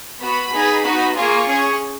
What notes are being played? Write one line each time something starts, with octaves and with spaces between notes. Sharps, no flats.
B3 F#4 B5
B3 D#4 G#4
B3 D#4 F#4
A#3 F4 G#4 C#6
C#4 G#4